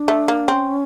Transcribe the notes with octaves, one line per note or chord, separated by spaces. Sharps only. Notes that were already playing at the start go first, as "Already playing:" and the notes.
Already playing: D4
A3
A#3
C4 C#4